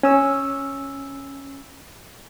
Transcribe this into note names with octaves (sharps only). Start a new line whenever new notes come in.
C#4 E6